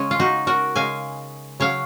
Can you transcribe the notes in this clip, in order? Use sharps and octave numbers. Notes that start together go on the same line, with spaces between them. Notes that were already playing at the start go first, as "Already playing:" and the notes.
Already playing: C#3 G#3 C#4
F4
D#4 F#4
F#4 A#4
C#3 G#3 F5 G#5
C#3 F#3 C#5 F5